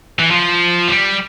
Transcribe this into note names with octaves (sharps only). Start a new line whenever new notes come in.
E3
F3
G3